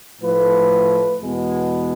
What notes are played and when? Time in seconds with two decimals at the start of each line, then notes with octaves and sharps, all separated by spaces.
0.22 A2 F3 A3 B4
1.21 E2 B2 G#3 B3